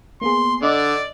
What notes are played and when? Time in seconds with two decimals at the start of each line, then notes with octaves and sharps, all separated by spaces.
0.21 A#3 B3 G#4 C6
0.62 D3 D5 D#5 D6